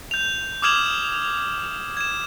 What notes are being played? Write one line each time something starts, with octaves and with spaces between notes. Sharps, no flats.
G6 F7
D6 D#6 F6 G#6 E7 F#7
G#6 E7